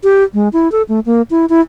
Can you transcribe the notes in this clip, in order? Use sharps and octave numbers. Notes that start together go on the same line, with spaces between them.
G4
G#3
E4
A4
A3
A#3
E4
E4